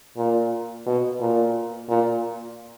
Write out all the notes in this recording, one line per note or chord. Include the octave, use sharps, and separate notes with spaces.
A#2
B2
A#2
A#2